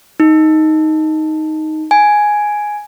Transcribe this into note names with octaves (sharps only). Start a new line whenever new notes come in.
D#4
G#5